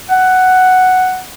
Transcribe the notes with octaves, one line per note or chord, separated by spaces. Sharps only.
F#5